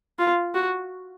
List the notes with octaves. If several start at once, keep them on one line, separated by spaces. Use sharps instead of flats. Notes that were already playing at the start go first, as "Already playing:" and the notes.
F4
F#4